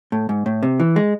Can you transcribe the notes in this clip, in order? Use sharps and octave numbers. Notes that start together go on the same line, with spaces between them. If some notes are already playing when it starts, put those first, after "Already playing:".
A2
G#2
A2
C3
E3
G#3